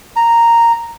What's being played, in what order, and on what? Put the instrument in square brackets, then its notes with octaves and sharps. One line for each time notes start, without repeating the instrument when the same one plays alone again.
[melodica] A#5